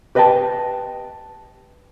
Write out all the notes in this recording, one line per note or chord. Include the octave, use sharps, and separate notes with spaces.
G4 B4 D#5 F5 G5 A5